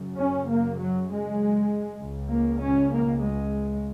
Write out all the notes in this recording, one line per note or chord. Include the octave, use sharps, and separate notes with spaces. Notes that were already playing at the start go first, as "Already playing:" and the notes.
Already playing: F#2 C#3
C#4
A#3
F#3
G#3
C#2 C#3
A#3
C#4
A#3
G#3